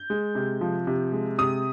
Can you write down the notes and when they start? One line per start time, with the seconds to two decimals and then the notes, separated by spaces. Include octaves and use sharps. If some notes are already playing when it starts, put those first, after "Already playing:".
Already playing: G6
0.10 G#3
0.35 C3
0.61 F3
0.87 C3
1.13 G#3
1.38 C3 D#6